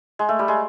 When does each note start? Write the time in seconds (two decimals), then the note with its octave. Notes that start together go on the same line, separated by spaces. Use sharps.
0.19 G#3
0.29 A3
0.39 G3
0.48 G#3